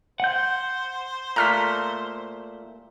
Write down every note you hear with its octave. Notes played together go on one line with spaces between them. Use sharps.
C5 F#5 G6
A#2 A3 A#5 F6 B6